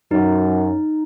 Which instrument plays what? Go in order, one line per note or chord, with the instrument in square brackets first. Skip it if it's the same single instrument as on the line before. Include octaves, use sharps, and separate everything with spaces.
[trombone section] F#2 [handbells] D#4